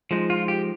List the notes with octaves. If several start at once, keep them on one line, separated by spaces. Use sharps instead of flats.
F3 G#3 D#4
F4
G4